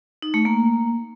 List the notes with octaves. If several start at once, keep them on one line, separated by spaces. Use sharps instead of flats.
D#4
A3
A#3